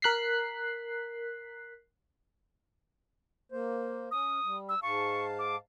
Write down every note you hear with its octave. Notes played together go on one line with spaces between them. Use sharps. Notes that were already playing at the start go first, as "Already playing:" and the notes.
A#4 F#6 B6 C7
A#3 C5
C#4 D#6
G3
E6
G#2 F5 A5 C#6
D6